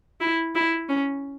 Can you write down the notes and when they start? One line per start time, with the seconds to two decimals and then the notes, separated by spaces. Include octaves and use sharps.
0.21 E4
0.55 E4
0.89 C#4